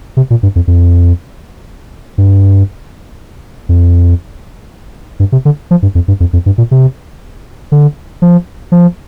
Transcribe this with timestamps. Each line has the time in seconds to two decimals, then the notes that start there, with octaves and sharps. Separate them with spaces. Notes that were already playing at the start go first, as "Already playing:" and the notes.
0.17 C3
0.30 A#2
0.43 G2
0.56 F2
0.68 F2
2.18 G2
3.69 F2
5.20 G2
5.32 C3
5.45 D3
5.71 F3
5.82 G2
5.95 F2
6.08 G2
6.20 F2
6.33 F2
6.46 G2
6.58 A#2
6.71 C3
7.72 D3
8.22 F3
8.72 F3